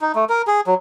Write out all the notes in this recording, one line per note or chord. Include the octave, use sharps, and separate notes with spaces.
D#4
A3
A#4
G#4
F#3